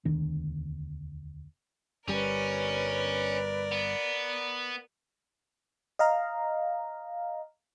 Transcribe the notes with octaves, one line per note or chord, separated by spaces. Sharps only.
E1 D2 D#3 D4
G1 G3 C#4 A#4 B4 D5
B3
D#5 F5 A#5